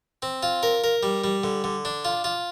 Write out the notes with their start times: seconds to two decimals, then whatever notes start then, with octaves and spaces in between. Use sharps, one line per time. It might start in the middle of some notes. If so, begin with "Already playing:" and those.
0.22 C4
0.43 F4
0.63 A#4
0.84 A#4
1.03 G3
1.24 G3
1.44 D3
1.64 D3
1.85 D4
2.05 F4
2.24 F4